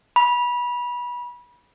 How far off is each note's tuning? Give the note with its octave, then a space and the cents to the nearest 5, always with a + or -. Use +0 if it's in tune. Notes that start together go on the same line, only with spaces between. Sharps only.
B5 -25